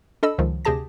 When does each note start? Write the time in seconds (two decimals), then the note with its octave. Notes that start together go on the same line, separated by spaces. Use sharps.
0.23 D4 A4 D#5 B5 E6
0.38 C#2 D#3 F3
0.65 D2 C3 G4 G#4 A5 A#6